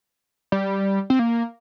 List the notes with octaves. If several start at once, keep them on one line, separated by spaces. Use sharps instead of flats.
G3
C4
A#3